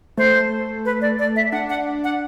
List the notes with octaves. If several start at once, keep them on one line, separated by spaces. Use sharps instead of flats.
A3 C5
B4
D5
D5
E5
D4 F#5
F#5
F#5